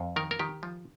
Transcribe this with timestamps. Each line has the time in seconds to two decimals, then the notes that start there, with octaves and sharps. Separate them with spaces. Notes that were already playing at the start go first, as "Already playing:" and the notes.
Already playing: F2
0.16 D#3 A#4
0.31 A#4
0.39 D#3 G4
0.63 F3